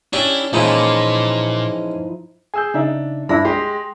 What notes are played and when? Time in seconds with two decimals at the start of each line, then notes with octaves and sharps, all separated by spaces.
0.13 C#4 D4 E4 G4
0.53 A#2 E3 F3 G#3 C#4 D#4 E4
2.54 G#4 G#5 E6 G6
2.74 C#3 D4 D#4 E5
3.29 G2 D4 E4 B5 A#6
3.45 G#3 G4 C6